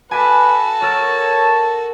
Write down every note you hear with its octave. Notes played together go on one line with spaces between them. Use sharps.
F#4 A4 B4 G#5 D6 B6
A#4 C#5 A5 E6